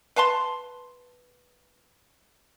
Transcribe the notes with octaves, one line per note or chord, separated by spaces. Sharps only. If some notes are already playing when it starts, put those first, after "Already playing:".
B4 F5 A5 C6